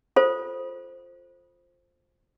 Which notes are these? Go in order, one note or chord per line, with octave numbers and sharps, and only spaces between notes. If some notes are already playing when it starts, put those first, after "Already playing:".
F4 A4 C5